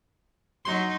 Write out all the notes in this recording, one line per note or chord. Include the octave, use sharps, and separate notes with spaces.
F#3 D#4 C6